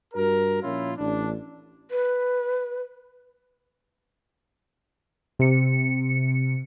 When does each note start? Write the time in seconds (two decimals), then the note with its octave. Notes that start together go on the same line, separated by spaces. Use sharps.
0.13 G2 F#4 A#4
0.62 A#2 F3 C#4 E4 F4
0.97 A1 D4
1.91 B4
5.39 C3 C#7